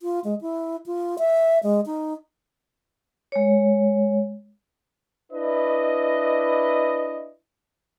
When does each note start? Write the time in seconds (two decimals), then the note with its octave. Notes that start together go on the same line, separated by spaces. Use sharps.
0.01 F4
0.24 G#3
0.41 E4
0.86 F4
1.19 E5
1.63 G#3
1.86 D#4
3.32 G#3 C#5
5.32 D4 E4 B4 D#5